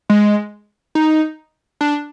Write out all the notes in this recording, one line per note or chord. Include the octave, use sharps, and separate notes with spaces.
G#3
D#4
D4